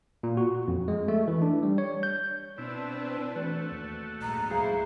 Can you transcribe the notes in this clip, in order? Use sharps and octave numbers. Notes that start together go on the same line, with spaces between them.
A#2
F#4
F2
G#3
A3
E3
D4
G3
C#5
G6
B2 C4 D4 E4 B4
E3 A3 F#4
D#2
A#1 G#2 A#5
C#2 F#3 E4 G#4 C5 F5